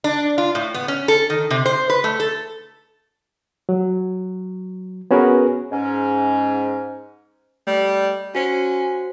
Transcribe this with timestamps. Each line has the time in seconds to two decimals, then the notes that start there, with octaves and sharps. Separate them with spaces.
0.04 D4
0.38 F4
0.55 A2
0.74 B3
0.88 C#4
1.08 A4
1.30 D#3
1.51 C3
1.66 C5
1.90 B4
2.04 A3
2.20 A4
3.69 F#3
5.11 B3 C#4 F#4 G#4 A#4 B4
5.71 G#2 C#4
7.67 G3 A3
8.35 C#4 F#4 C5 C#7